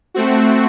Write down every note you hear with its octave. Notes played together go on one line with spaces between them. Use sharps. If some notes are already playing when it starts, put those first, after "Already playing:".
A3 C4 F#4